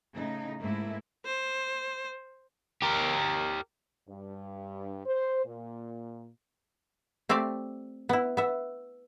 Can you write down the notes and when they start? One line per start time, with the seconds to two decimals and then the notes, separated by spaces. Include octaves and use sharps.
0.13 A2 C#3 D#4
0.61 G#2 A3 A#3 E4
1.25 C5
2.82 G4 A#4
4.08 G2
5.06 C5
5.45 A#2
7.29 A3 C4 G4 D5 E5
8.09 B3 E4
8.37 B3 E5